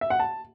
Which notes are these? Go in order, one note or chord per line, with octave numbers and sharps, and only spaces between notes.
E5
F#5
A5